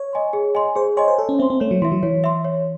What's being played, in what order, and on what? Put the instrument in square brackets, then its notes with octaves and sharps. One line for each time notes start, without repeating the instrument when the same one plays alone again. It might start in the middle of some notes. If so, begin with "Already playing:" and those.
Already playing: [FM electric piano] C#5
[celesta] D#5 G#5 C6
G#4
D#5 G#5 C6
[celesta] G#4 [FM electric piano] C5
[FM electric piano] C#5 [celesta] D#5 G#5 C6
[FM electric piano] C5
[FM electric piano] A4 [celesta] C#5
[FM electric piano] C#4
[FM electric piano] C4 [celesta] E5
[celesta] C6
[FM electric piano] C4
[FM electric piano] A3 [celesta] C#5
[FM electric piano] F#3
[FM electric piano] E3 [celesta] E5 C6
[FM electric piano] F#3
[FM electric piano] E3 [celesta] C#5
[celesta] E5 C6
C#5